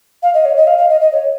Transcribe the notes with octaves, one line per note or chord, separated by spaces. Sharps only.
F5
D#5
C#5
D#5
F5
F5
D#5
D#5
C#5